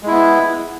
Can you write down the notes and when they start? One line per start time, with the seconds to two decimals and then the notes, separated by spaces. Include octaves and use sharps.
0.03 G#3
0.07 E4
0.11 B3